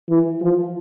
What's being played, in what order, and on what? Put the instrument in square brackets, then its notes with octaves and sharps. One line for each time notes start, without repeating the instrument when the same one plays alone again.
[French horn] E3
F3